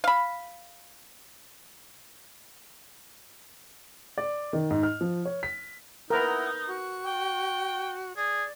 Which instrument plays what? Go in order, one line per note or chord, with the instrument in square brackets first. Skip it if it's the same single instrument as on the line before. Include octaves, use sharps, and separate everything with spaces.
[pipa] F5 B5
[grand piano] D5
D#3
G#2
F6
F3
C#5
B6
[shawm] D#4 [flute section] E4 F#5 D#6 [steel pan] A#4 B4
[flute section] F#4 C#6
[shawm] G5
[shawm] G#4 [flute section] D5